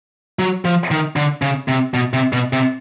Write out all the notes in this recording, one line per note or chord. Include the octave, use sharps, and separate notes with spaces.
F#3
F3
D#3
D3
C#3
C3
B2
C3
B2
C3